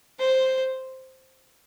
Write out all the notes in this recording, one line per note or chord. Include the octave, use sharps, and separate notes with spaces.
C5